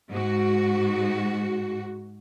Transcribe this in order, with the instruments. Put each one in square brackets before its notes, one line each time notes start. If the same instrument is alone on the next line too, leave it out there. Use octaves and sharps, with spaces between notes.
[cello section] G#2 F#4